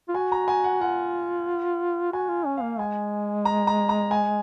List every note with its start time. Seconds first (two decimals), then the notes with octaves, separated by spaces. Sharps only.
0.09 F4
0.15 F#4 G#5
0.32 A#5
0.48 G#5
0.64 F#5
0.81 F4 F#5
2.12 F#4 G#5
2.29 F4
2.46 C#4
2.57 A#3 F5
2.79 G#3 G#5
3.45 A#5
3.67 A#5
3.89 A#5
4.11 G#5